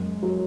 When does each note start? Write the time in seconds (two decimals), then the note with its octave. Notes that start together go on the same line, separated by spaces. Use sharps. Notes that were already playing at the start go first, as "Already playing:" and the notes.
Already playing: F#2 G#3
0.23 F#3